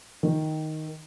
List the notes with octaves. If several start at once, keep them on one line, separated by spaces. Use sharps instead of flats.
D#3